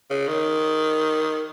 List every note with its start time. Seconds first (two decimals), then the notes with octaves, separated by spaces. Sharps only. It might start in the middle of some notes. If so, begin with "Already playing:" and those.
0.10 C#3
0.28 D#3